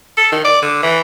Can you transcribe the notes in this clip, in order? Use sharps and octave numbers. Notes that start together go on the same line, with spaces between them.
A4
D#3
D5
D3
E3